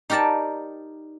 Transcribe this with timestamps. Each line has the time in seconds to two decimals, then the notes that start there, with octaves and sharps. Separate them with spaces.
0.10 D#4 G4 A#4 D5 A5